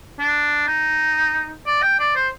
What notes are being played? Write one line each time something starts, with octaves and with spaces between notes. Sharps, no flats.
D4
D#4
D5
G5
D5
C5